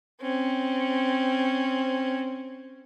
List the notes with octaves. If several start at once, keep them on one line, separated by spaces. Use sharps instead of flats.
C4 C#4